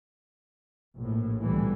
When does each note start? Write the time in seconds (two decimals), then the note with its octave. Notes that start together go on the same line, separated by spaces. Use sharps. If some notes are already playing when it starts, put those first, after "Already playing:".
0.97 A#1 A2
1.43 C2 B2 D3 E3 G3